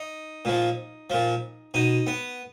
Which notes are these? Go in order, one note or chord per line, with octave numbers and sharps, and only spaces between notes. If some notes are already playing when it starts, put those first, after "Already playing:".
Already playing: D#4
A#2 F3
A#2 F3
B2 D#4
B3